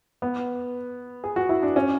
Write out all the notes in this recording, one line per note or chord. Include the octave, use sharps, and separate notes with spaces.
B3
G#4
F#4
E4
D4
C#4